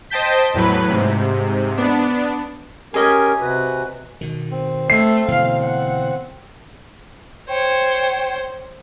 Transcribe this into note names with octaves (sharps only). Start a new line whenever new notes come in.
C5 D#5 G5 A5 G6 B6
E2 A2 F#3 B4
G#2 C3
B3 D4
C#4 G4 G#4 A#4 D#5 G#5
C3 F#4 B4
B2 D#3
C4
A3 C7
B2 D3 E3 F5
F#5
C5 C#5 G5